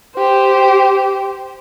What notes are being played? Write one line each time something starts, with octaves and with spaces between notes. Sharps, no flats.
G4 C5